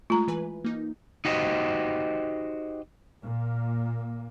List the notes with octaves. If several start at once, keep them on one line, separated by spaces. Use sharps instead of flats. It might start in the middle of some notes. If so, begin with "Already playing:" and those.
G#3 A3 F4 A#5
E3 B4 G#5
A#3 D#4
D#4 F#4 G4 C5 D#5
A#2 A#3